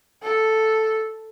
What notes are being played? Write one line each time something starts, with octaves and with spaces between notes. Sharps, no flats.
A4